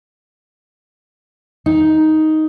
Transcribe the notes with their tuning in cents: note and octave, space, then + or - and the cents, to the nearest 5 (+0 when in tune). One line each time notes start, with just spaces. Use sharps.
D#4 +5